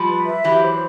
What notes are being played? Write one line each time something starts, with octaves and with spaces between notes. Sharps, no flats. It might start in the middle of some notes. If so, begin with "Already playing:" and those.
Already playing: F3 G3
B4
E5
E3 F#3 G4
C5